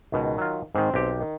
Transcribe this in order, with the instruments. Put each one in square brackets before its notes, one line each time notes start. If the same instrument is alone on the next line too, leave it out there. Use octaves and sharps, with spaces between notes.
[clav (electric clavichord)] C#2 B2 [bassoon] D#3
[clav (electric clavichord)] F#3 F4
[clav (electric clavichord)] G#2 D#3 [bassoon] C4
[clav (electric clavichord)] B1 G4
[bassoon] D#3